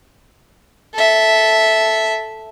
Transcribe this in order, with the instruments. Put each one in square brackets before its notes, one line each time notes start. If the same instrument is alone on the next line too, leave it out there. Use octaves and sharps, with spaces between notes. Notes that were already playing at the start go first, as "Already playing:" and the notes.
[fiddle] A4 E5